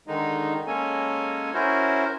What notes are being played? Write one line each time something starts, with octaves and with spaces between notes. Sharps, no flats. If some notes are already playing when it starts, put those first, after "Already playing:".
D3 D#3 G#3 D#4
G#3 A#3 C#4 A4 C#5 G#5
C#4 E4 F#4 A#4 C5